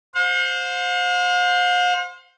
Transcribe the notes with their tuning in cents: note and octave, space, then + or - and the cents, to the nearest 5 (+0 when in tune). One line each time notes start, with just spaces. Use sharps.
C5 +0 F5 +45